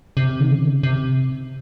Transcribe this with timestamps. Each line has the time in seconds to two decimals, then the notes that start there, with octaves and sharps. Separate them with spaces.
0.17 C3
0.40 D#3
0.51 C#3
0.83 C3